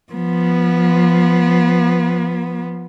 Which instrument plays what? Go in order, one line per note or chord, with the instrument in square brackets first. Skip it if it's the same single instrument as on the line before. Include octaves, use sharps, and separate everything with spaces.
[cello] F3 B3